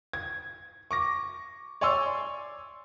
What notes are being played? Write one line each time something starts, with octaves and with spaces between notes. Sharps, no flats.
G#6
C#6 D6 A#6
C#5 D5 G#5 C6 C#6 E6